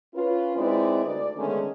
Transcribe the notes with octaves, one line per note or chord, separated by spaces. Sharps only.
C#4 F4 B4
G#3 C4 D#4 E4 B4 D5
D2 D5
D3 D#3 G#3 A3 B3 C#4